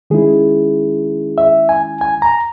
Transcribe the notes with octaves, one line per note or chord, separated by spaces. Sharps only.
D#3 G#3 C#4 E4 G#4
E5
G#5
G#5
A#5